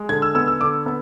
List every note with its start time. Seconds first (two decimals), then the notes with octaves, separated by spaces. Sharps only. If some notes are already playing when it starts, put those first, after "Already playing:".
Already playing: G#3
0.09 D3 G#6
0.22 E6
0.35 B3 E6
0.47 E6
0.60 D3 D6
0.86 B3